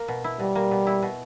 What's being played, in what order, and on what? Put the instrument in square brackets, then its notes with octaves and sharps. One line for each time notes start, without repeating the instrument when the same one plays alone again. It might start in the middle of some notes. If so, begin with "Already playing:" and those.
Already playing: [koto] A#3
B2
E4
[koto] B2 [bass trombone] G3
[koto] A#3
B2
E4
B2